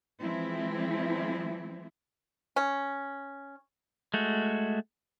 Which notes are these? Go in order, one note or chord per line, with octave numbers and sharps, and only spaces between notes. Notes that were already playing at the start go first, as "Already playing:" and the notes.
E3 F3 G#3 C4 E4
C#4
G#3 A3 F#4